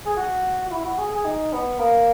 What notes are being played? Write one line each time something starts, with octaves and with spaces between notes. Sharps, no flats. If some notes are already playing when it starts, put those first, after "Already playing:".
G#4
F#4
F#4
E4
F#4
G#4
G#4
D#4
B3
A#3